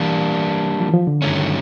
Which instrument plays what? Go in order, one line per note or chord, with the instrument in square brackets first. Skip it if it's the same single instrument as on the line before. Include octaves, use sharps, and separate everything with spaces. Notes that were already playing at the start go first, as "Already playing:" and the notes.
Already playing: [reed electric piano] E3 [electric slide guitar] G3 A#3 D4
[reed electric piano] F3
E3
F3
D3
[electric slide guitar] G2 D#3 F#3 A3 C#4